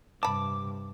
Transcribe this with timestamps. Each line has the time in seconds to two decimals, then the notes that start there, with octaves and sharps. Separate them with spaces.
0.23 G2 C3 A5 B5 D6